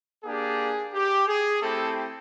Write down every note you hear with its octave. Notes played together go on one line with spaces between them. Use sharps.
A#3 D4 G4 G#4
G4
G#4
A3 C4 E4 G4 A4